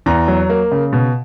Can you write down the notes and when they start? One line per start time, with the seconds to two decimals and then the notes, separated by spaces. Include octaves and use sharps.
0.06 E2 A#5
0.28 F#3
0.50 A#3
0.72 C#3
0.93 B2